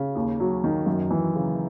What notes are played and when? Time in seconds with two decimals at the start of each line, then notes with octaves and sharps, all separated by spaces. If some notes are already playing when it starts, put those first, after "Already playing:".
Already playing: C#3
0.16 D#2
0.40 F#3
0.64 D#3
0.86 F#2
1.11 E3
1.35 C#3